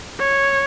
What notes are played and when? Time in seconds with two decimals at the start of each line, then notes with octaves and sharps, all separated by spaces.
0.20 C#5